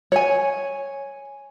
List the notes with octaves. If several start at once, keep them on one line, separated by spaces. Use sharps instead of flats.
C#5 G#5